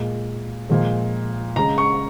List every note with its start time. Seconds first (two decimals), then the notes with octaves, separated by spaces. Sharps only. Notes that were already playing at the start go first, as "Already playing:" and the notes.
Already playing: A#2 G#3
0.69 A#2 F3 G#3
1.56 C#3 G#3 A#5
1.78 C#6